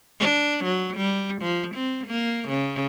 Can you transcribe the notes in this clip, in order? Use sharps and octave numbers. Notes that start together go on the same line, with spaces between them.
D4
F#3
G3
F3
C4
A#3
C#3